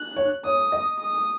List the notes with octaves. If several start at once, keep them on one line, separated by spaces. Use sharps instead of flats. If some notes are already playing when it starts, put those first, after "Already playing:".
Already playing: F#6
C#5
C#5 D#6
D#5
D#6